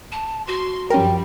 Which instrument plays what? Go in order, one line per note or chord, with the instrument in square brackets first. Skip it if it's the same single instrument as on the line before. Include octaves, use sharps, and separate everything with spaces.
[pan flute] A5
[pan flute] F#4 [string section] C6
[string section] F#2 F3 G3 [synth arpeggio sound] C#4 A#4 [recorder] G5